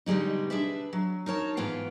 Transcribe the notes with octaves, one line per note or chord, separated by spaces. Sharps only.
B2 D3 G3 G#3 D#4
D4 G#4 B4 E5
F#3
D#4 A#4 C#5 A5
G#2 E3 B3 F4 G5